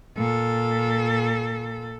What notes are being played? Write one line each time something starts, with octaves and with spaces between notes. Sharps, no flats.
A#2 A4